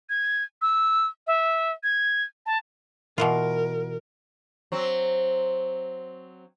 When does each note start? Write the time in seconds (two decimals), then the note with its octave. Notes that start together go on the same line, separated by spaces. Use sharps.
0.09 G#6
0.62 E6
1.27 E5
1.83 G#6
2.46 A5
3.18 B2 E3 F4 A#4
4.72 F#3 C4